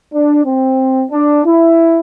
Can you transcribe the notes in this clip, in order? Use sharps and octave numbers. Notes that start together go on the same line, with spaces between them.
D4
C4
D4
E4